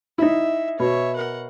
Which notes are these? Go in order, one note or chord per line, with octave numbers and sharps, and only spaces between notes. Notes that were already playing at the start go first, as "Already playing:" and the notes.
D#4 E4 E5
B2 C#5 E5
A#4 F#5